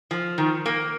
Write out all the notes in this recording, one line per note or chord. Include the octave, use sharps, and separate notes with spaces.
F3
D#3
A#3